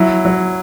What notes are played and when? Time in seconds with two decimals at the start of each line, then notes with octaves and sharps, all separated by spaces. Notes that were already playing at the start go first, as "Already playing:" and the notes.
Already playing: F#3 E4
0.25 F#3